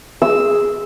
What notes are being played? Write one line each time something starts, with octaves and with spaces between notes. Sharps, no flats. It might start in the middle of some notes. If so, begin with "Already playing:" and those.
G#4 E6